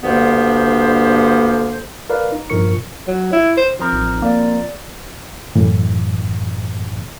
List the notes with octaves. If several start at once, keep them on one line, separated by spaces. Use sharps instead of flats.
D2 G2 A#3 B3 C5
A#4 B4 D5 F5
D#4
G2 A#2 F3 A#4 C#6 C#7
F#3
E4
C5
F3 C4 A#4
A1 D#4
A#3 D5
F#2 A2 E3